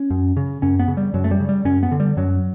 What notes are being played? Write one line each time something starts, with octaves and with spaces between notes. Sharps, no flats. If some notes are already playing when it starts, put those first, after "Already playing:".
Already playing: C#4
F#2
C#3
F#2 C#4
B3
C#3
G3
F#2 F#3
A3
G3
C#3
G3
F#2 C#4
B3
D3
G3
F#2 F#3